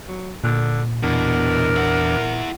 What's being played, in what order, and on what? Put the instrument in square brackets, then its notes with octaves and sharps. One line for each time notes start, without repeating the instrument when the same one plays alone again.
[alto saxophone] F#3
[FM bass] A#2 [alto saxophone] D3
[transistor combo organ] E2 D4 [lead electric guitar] B2 [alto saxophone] A#4
[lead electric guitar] E4 F#5